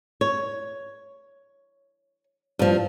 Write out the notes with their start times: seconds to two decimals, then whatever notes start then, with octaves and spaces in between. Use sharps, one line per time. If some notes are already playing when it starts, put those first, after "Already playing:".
0.21 C#5
2.59 G2 F3